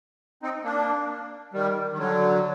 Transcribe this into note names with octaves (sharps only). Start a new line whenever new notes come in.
C4 D#4
A#3 D4
D#3 G3
D#3
D3 F#3